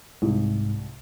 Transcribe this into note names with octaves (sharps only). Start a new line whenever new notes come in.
C2 G#2